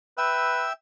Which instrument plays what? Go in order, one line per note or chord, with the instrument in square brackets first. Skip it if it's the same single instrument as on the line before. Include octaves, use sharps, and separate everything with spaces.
[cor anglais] B4 [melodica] E5 G5 E6